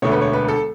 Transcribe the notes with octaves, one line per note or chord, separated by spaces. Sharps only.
E1 D2 D3 A3 C#5
B4
C#5
B4
A4